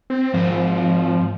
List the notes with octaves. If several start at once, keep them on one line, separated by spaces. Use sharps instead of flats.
C4
G#2 F3 C4